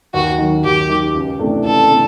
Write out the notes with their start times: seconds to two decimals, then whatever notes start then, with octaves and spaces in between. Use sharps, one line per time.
0.14 D#2 F#4
0.38 D#3 F#3
0.63 D#2 G4
0.89 D#3 F#3
1.15 C#2
1.39 C3 E3 A3 D4
1.65 C#2 A4
1.91 C3 E3 A3 D4